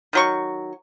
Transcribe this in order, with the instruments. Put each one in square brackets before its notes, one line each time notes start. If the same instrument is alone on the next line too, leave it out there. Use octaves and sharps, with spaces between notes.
[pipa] D#3 F#3 C#6